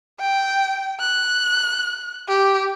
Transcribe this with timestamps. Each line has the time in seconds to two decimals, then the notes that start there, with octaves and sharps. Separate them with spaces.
0.20 G5
1.00 F#6
2.28 G4